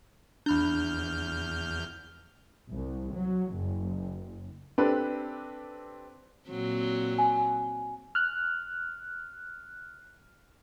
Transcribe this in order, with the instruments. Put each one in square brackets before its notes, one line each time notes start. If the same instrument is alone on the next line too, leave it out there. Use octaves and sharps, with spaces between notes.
[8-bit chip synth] E2 F6 G6 [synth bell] D4 B5
[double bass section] C2
F#3
F#1
[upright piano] C4 D4 G4 A4 B4
[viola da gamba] A#2 F#3 C4
[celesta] G#5
[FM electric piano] F6 F#6